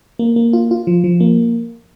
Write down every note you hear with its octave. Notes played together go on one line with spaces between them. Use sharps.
A#3
A#3
F4
F4
F3
F3
A#3